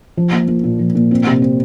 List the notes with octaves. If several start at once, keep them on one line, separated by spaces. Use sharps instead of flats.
F3
A#3
A#3
A#2
F3
A#2
C4
C3
C4